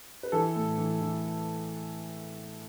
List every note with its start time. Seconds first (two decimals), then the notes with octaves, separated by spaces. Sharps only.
0.23 B4
0.32 E3 A4
0.56 A2
0.78 E3
1.01 E3